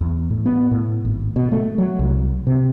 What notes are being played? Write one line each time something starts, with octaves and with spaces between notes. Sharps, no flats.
E2
A2
B3
A2
G#1
B2
A3
F#3
C2
C3